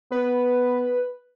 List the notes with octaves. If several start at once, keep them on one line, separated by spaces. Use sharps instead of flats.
B3 B4